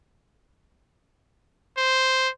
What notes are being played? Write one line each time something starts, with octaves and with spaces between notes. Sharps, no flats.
C5